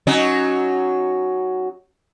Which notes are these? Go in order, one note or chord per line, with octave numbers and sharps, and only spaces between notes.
F#3 C#4 D#4